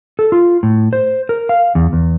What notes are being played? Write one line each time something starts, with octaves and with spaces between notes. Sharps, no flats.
A4
F4
A2
C5
A#4
F5
E2
E2